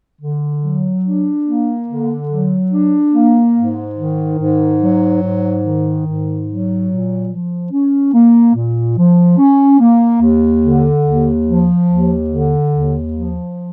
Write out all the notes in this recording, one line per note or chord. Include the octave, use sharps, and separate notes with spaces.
D3
F#3
D4
A#3
D3
F#3
D4
A#3
G#2
D#3
G#2
F#3
G#2
D#3
G#2
F#3
A#2
F3
C#4
A#3
A#2
F3
C#4
A#3
D#2
D3
D#2
F3
D#2
D3
D#2
F3